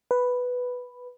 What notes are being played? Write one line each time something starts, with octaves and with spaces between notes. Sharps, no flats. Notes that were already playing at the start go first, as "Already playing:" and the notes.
B4